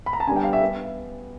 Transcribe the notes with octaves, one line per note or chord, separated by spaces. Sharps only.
B5
A#5
A5
D3 G3 B3 G#5
G5
F5
E5
B3